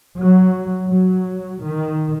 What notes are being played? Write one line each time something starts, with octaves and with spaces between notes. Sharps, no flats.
F#3
F#3
D#3